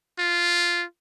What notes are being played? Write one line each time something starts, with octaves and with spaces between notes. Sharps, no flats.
F4